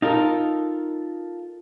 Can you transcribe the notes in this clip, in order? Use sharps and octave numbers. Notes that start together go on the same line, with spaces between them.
D#4 F4 A4 A#4